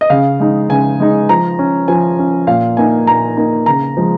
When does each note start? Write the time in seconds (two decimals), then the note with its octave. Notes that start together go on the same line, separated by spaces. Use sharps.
0.01 D#5
0.10 C#3 F5
0.40 G#3 D#4
0.69 C#3 G#5
1.00 G#3 D#4
1.29 F3 A#5
1.59 C#4
1.88 F3 G#5
2.19 C#4
2.47 A#2 F5
2.77 A#3 D#4 G#5
3.07 A#2 A#5
3.37 A#3 D#4
3.66 C#3 A#5
3.97 F3 G#3